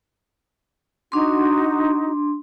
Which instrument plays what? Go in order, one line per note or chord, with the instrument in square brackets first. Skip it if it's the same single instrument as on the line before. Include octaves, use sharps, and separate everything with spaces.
[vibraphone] D4 C6 [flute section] D#4 F#4